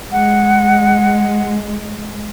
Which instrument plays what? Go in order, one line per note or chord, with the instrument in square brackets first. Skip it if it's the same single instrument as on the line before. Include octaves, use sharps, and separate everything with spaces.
[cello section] G#3 [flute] F#5